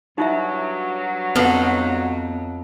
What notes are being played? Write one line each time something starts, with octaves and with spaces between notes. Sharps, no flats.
G2 F#3 D#4 E4 E5
F2 B3 D#4 B4 F#5